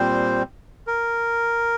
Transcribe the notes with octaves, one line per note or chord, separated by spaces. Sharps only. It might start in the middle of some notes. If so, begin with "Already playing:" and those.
Already playing: A#2 G3 C4 C5
A#4